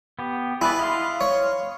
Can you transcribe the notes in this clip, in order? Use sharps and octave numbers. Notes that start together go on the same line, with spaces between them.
B3 G4
E4 G#4 B4 D5
D#5 F5 C6
C#5